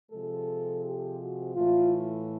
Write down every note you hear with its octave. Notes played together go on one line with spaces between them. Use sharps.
C3 F3 G#3 A4
G4
F#4
A2 E3 A3 F4